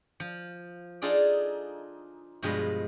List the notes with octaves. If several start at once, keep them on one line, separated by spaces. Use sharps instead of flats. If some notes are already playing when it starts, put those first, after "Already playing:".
F3
D4 D#4 F4 G#4 A4 D5
G2 B2 F3 G#3